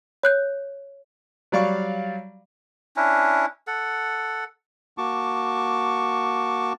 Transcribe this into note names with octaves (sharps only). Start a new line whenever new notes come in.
C#5 F#6 G6
F#3 G3 D5 F5 C#6
C#4 D4 E4
A4 F#5
A#3 F#4 A5 C#6 D6